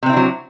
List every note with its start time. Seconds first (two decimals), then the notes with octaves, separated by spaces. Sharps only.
0.03 C3
0.06 C4
0.10 E4
0.13 D4
0.16 F#3